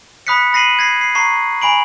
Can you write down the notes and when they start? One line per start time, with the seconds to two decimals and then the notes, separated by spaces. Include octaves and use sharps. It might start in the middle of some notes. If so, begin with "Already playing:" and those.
0.27 B5 D#6 F#6 B6 C#7
0.53 B5 A#6 C7 D#7 F#7
0.79 G#6 A#6 C7
1.01 C7
1.15 A#5 C#6 C7
1.62 G#5 B5 D7 F#7